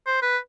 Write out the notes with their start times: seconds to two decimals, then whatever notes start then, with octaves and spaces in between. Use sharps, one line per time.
0.06 C5
0.22 B4